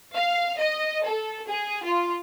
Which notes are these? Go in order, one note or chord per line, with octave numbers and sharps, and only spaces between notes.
F5
D#5
A4
G#4
F4